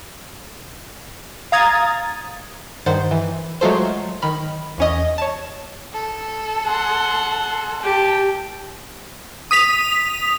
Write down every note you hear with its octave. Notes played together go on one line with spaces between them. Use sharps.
F5 A#5 D#6 G#6 A6
G2 D#3 C5 F#5 A6
E3
F#3 G#3 A3 F4 A4 C5
D#3 B5 F6
E2 C#4 D#5
C#5 A5
A4
F#5 C6
G4 G5 A5
D#6 B6 F7